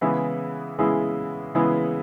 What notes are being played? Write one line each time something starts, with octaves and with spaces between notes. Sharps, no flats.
C#3 E3 G#3 B3 E4
C#3 E3 G#3 B3 E4
C#3 E3 G#3 B3 E4